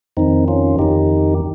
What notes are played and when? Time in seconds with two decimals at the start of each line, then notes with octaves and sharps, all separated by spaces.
0.17 F2 D#3 C4 D#4
0.48 C#4 F4
0.79 F2 D#3 D#4 G4